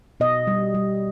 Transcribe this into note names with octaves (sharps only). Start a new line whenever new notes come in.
B2 D#5
G3
G3